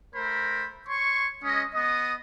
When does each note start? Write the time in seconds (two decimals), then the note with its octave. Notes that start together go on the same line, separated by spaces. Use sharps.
0.15 A3 A#4 C5 B5
0.88 C#5 C6 C#6
1.44 G#3 C#4 D#5
1.75 B3 D#5 D#6